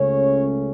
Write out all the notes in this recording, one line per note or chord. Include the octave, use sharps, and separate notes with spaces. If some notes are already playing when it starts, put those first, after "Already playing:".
Already playing: C#2 C#3 A3 C#4 C#5